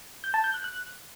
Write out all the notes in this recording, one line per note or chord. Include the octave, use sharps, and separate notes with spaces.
G6
A5
G6
F#6
F#6